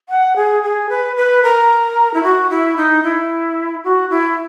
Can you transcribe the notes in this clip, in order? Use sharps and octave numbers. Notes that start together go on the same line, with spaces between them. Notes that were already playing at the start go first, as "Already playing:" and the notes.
F#5
G#4
G#4
B4
B4
A#4
E4
F#4
E4
D#4
E4
F#4
E4